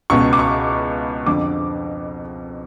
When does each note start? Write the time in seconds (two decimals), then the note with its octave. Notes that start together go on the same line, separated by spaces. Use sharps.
0.10 C#2 B2 C#6
0.33 D6
0.39 C#6
1.26 F2 D3 D6